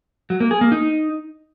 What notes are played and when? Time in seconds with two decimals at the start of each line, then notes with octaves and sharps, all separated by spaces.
0.30 F#3
0.40 A#3
0.51 G#4
0.61 A#3
0.72 D#4